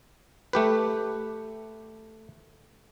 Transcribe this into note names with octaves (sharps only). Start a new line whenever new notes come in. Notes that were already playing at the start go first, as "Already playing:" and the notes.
A3 G4 B4